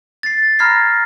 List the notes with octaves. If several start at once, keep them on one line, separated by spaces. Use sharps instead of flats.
A6 C7
A#5 B5 F6 G#6 A#6 C7